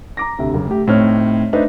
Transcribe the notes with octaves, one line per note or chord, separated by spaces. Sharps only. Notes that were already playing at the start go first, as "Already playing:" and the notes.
A#5 D6 A#6
D2 C3 E5
F#1
A3 G4
A2 A3 C4 D#4 C#5 F6
A3 D4 D#4 B4 C5 E5